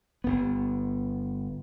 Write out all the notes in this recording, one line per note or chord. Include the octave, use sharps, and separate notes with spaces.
G1 B3